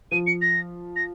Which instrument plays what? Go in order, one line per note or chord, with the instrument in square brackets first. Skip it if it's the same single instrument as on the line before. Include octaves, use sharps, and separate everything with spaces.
[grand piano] F3 [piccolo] D#7
[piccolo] C#7
A#6
A#6